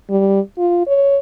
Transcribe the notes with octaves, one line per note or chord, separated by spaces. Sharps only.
G3
F4
C#5